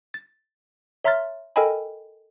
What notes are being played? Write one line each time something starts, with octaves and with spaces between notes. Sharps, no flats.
A6
C#5 E5 A#5 C6 F6 A6
A4 A#4 D#5 G5 G#5 B5